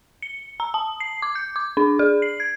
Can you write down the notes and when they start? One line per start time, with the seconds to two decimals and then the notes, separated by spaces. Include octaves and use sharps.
0.22 C#7
0.60 A#5
0.74 A5
1.00 C7
1.22 D6
1.35 G6
1.56 D6
1.77 D4
1.99 G#4
2.22 C7
2.40 G#6